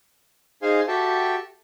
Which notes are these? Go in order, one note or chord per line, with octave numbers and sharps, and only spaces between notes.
D#4 G#4 C5 F5 G#5 C6
F#4 G4 A4 E5 G5 A5